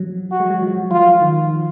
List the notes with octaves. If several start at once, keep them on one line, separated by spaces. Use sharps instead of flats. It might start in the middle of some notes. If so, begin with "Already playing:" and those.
Already playing: F3 F#3
F#4
G#3
F#3
F3
F#3
F3 F4
F3
D#3